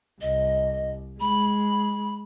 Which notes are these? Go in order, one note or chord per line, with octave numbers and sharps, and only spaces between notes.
C2 D#5
G#3 B5